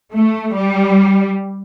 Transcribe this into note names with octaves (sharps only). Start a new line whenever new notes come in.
A3
G3